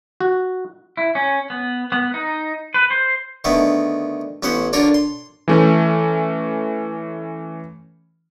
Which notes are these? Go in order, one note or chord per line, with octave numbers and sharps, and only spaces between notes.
F#4
E4
C#4
B3
B3
D#4
B4
C5
D3 D#3 A3 B3
A1 B3 C#4 C5 F#5
D3 D4 F4 A#4 C#5 D5
C6
E3 A3 C#4